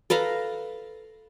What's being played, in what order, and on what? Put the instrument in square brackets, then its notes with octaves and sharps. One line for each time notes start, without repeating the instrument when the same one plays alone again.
[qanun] A4 B4 F5 A#5